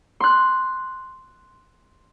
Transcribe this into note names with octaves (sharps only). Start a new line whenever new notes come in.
C6 F#6